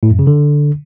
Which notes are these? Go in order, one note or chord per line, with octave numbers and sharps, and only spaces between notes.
A2
F#2
C#3
D3